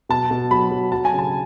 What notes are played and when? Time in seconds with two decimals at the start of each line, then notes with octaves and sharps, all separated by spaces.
0.09 B2 A5
0.31 B2
0.51 F#3 B5
0.71 F#3
0.92 F#3 A5
1.05 G#5
1.13 C#3
1.19 A5